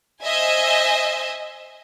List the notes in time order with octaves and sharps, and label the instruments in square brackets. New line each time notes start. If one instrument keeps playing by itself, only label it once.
[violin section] C5 D#5 E5 G#5